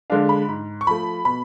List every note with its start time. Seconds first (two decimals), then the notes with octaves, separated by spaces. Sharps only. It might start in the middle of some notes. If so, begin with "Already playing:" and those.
0.10 D3 G#3 D4 F5
0.29 B5
0.48 G#2
0.81 C#6
0.87 F3 A3 B5
1.25 B2 B5